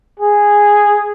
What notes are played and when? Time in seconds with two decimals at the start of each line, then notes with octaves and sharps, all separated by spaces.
0.20 G#4